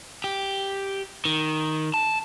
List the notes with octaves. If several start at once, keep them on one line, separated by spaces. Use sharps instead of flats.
G4
D#3
A5